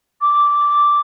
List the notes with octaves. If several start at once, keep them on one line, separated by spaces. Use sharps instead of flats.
D6